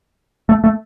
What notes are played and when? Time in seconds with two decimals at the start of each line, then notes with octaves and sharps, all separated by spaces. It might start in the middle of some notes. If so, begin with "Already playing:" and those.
0.49 A3
0.64 A3